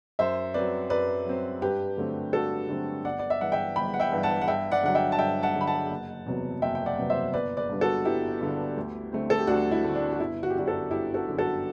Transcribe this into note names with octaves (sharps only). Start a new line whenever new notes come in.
F#2 C5 E5
F#3 C4 B4 D5
F#2 B4 D5
F#3 C4
G2 G4 B4
D3 F#3 A3 C4
G2 F#4 A4
D3 F#3 A3 C4
G1 D5 F#5
D5
E5
G2 E3 F#5
E5 G5
G1 G5 B5
F#5
E5 G5
G2 E3
F#5 A5
F#5
G2 E5 G5
D5 F#5
D3 F#3 F#5
E5 G5
A5
G2 E5 G5
F#5 A5
D3 F#3
B5
F#5 A5
F#1
E2 C3 F#3 B3
F#1 E5 G5
G5
D5 F#5
E2 C3 F#3 B3
C5 E5
G1 B4 D5
B4 D5
G2 D3 G3
F#4 A4
G1 E4 G4
G2 D3 G3
D2
D3 A3 C4
A4
G4
D2 D4 F#4
E4
D3 A3 C4
D4
F#4
G1 E4
F#4
G4
F#2 D3 D4 F#4
F#4 A4
G1 E4 G4
F#4 A4
F#2 D3
F#4 A4